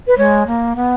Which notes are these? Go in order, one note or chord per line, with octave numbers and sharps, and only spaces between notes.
B4
G#3 C#5
A#3
B3